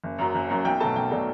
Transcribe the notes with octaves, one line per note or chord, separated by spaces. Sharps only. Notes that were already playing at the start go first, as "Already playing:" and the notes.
F#1
F#2 F#3
F#1
F#2 F#3
B1 G5
B2 F#3 A3 A5
B1 G5
B2 F#3 A3 D5